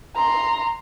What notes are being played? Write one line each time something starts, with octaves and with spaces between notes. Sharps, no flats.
A#5 C6